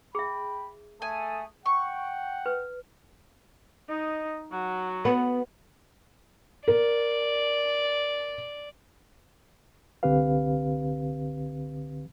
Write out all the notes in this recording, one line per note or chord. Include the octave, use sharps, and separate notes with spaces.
G#4 E5 G5 B5
A3 A4 G#5 D#6
F#5 G5 C#6
B4
D#4 D#5
F#3 F#4
B3 B4 F#5
A#4 D5
C2 D3 C4 G4 B4 F5